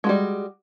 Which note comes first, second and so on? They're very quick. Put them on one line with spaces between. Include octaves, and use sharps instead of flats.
G#3 F#4 G3